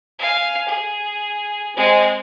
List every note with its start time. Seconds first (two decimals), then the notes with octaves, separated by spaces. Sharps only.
0.19 F5 G#5
0.68 G#4
1.76 G#3 C4